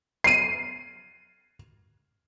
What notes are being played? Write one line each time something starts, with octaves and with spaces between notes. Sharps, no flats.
C7 D#7